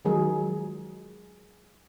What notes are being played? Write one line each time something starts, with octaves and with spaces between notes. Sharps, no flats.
D#3 F3 F#3 G#3 G#4 A#4